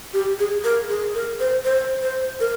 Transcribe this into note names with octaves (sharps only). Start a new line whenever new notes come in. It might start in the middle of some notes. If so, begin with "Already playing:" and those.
G4
G#4
A#4
G#4
A#4
C5
C5
C5
A#4